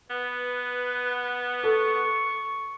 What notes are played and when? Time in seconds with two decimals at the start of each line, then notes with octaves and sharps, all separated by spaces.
0.10 B3 B4
1.64 A4 C#6